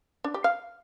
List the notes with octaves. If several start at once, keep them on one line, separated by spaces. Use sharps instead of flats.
D4
G4
F5